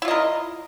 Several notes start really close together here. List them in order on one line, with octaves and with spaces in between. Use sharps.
E4 F4 D#5 A#4